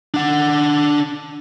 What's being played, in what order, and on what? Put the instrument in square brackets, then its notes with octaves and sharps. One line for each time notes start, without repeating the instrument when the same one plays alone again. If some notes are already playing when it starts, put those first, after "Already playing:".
[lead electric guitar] D4 F#5